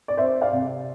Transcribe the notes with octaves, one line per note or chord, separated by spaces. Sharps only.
D5
C4 C5 E5
D5 F5
C3